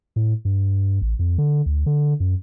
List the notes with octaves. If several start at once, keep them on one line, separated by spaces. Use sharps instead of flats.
A2
G2
A1
F2
D3
D2
D3
F#2